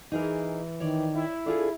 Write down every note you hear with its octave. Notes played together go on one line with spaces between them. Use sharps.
E3 D#4 G#4 A#4
D#3 C#5 D5
E4
D4 F4 G#4 A4